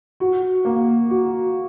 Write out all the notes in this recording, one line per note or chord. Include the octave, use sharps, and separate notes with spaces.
F#4
A#3
F#4